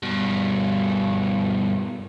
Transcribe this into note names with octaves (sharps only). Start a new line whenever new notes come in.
G2 B2